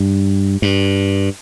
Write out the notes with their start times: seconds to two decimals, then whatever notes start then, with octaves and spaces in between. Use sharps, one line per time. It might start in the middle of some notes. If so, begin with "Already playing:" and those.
Already playing: G2
0.62 G2